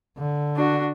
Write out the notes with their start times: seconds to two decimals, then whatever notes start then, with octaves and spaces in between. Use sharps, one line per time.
0.18 D3
0.57 D4 F#4